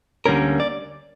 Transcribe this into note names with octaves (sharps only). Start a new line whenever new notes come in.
D2 D3 G3 A#3 C#4 A#4
D5